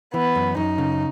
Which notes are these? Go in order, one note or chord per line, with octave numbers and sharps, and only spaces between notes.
E3 B3
F#2
F#2 D#4
C#3